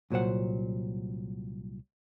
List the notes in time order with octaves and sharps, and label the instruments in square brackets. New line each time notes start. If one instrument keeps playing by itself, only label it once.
[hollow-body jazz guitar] C2 A#2 F#3 C5 F#5